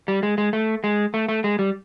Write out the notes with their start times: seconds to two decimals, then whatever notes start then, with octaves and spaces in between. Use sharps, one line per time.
0.08 G3
0.23 G#3
0.38 G#3
0.53 A3
0.84 G#3
1.14 A3
1.28 A3
1.44 G#3
1.59 G3